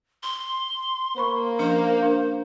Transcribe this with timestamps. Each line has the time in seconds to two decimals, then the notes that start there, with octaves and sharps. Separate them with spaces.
0.23 C6
1.16 A#3 C5 B5 C#6
1.59 F3 C#4 D4 C5
2.03 D4